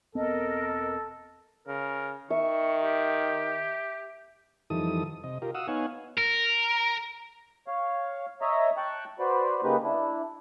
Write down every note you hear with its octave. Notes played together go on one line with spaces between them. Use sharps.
E1 B3 C4 A4 A#4 D#5
C#3 A#4
D#3 E5 C#6
G4
F2 D#3 E3 G3 A4 D#6
C3 D#5
F4 G4 A#4
F#4 F5 F#5 D#6 E6
B3 D#4 C#5 F5 F#5 G#5
A#4
C#5 F5
C#5 D#5 E5 A#5
G5 A5 C#6 F#6
F#4 B4 C5 D5
C#3 A#3 D#4 G4 B4
D4 E4